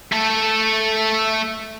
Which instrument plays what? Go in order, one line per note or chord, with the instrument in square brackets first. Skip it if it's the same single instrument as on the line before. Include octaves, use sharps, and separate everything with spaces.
[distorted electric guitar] A3 A4